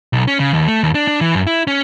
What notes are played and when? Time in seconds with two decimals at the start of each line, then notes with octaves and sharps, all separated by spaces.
0.13 B1
0.28 C#4
0.40 C#3
0.53 D#2
0.68 A3
0.83 D#2
0.95 D4
1.08 D4
1.21 E3
1.35 F#2
1.47 E4
1.67 C#4